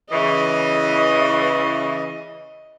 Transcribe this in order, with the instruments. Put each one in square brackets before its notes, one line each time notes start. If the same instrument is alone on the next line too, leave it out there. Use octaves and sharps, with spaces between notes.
[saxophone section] C#3 E3 [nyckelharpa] D#5